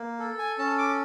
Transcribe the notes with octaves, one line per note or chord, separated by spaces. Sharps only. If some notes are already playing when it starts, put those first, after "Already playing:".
Already playing: A#3
A4
G#5
C#4 A5
D6